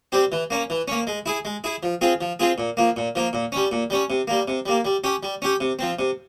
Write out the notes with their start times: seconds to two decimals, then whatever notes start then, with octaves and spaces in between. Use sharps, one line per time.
0.12 G3 C4 G4
0.32 E3
0.50 A#3 C#4
0.70 E3
0.88 A#3 C#4
1.07 G#3
1.26 E4 G#4
1.45 G#3
1.64 E4 G#4
1.83 F3
2.01 C4 F4 G#4
2.21 F3
2.40 C4 F4 G#4
2.58 A#2
2.77 F3 A#3
2.97 A#2
3.15 F3 A#3
3.33 A#2
3.52 G3 C#4
3.72 A#2
3.90 G3 C#4
4.10 C3
4.28 G3 A#3
4.48 C3
4.66 G3 A#3
4.85 G3
5.04 C#4 G4
5.23 G3
5.42 C#4 G4
5.60 C3
5.79 F3 C4
5.99 C3